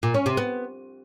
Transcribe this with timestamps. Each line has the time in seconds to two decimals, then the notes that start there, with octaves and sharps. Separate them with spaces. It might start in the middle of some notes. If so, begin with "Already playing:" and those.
0.03 A#2
0.14 C#4
0.26 C3
0.37 B3